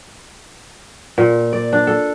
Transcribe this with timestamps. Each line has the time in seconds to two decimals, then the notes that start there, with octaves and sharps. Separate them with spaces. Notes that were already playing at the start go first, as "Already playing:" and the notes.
1.18 A#2
1.53 D5
1.73 D4
1.87 A4